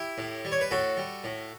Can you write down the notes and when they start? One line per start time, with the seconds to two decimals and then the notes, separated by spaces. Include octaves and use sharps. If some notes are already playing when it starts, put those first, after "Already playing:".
Already playing: E4 G4
0.18 A2
0.45 G3
0.52 C#5
0.61 B4
0.71 A2 F#4 A4
0.97 G3
1.24 A2